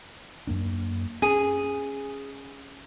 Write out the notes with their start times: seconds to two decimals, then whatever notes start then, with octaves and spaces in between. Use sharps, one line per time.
0.47 F#2 A#3 D4
1.22 C4 C#4 G#4